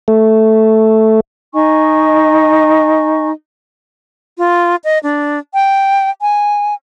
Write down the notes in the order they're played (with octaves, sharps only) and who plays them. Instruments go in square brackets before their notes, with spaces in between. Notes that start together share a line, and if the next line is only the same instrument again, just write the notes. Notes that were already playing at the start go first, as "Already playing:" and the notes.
[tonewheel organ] A3
[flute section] D#4 D#5 G#5 C#6
[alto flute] F4
D#5
D4
G5
G#5